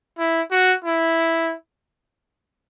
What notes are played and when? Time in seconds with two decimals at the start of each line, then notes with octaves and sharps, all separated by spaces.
0.19 E4
0.51 F#4
0.85 E4